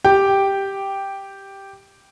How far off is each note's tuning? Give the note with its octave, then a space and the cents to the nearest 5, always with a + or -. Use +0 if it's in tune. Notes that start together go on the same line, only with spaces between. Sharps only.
G4 +0 G5 +0